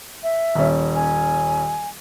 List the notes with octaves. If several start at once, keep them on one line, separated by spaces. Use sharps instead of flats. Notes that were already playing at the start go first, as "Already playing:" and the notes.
E5
D#1 C#4
G#5